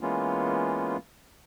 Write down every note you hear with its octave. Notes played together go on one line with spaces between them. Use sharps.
E3 G#3 A#3 B3 C#4 F4